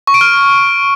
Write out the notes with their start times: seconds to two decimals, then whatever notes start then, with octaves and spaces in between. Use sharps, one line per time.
0.07 C#6
0.14 D7
0.21 F6